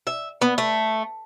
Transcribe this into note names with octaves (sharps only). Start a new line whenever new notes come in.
E5
B3
A3